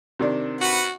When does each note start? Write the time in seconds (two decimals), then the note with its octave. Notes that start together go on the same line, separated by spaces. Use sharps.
0.19 C3 D#3 D4
0.61 F#4 B4 F#5